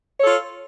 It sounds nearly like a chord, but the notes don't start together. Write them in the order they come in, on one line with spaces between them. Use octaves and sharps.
C#5 A4 F4